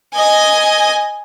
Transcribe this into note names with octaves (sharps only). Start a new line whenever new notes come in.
D#5 G#5